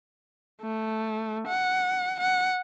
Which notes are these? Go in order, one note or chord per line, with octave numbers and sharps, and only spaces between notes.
A3
F#5
F#5